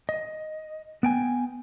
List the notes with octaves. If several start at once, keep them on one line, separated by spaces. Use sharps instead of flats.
D#5
B3 G5 G#5